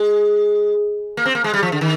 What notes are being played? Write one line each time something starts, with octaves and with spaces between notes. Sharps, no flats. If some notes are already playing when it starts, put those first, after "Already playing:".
Already playing: G#3
A#3
C4
A#3
G#3
G3
F3
D3
D#3